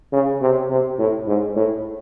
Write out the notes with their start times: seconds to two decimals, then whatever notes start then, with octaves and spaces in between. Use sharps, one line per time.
0.12 C#3
0.41 C3
0.70 C3
0.98 A2
1.27 G#2
1.56 A2